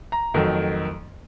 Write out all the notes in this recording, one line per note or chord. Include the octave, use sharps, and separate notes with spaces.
A#5
F2 D#3 F#3 A3